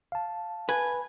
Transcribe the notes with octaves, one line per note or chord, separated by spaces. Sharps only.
F5 A5
B4 G#5